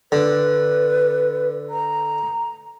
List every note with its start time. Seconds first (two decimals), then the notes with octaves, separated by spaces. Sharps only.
0.12 D3 B4
1.70 A#5